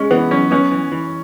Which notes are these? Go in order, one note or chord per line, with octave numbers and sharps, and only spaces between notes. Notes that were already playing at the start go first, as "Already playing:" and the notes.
Already playing: G#3 C#4
E3 B3
F#2 C#4
B3 C#4
E3
E3